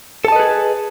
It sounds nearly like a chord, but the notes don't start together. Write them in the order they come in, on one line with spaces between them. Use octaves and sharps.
A4 A5 D#5 B4 G#4